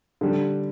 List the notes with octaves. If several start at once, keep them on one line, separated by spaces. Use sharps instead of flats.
D3 G3